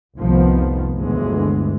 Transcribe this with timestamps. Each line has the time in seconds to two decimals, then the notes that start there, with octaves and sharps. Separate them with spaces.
0.17 F1 C2 D#3 F3 B3
0.95 G1 D2 B2 E3 G#3